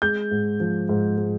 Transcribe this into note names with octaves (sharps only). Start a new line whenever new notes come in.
G#3 G6
G#2
F3
G#2
G#3